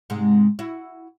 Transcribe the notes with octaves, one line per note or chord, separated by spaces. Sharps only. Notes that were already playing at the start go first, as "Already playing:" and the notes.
G#2 C3 G#3
E4 F#4